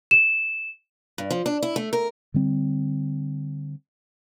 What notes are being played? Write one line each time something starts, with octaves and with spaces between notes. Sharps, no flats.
E7
G2
F3
D4
E4
A3
A#4
D3 G3 C4